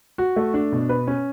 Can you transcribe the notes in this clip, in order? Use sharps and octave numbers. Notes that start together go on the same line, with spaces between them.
F#4
A3
D4
B2
B4
C#4